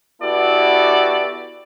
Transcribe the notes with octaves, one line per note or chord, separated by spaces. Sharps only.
B3 E4 F#4 G4 A4 D5